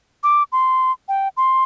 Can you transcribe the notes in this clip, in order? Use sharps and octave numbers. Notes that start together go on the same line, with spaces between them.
D6
C6
G5
C6